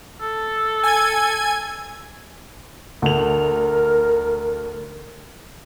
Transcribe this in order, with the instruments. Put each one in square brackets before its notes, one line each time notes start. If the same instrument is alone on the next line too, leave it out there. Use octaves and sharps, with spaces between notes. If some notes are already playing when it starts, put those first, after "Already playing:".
[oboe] A4
[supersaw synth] G#5 G#6
[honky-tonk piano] D2 F7 [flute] A#4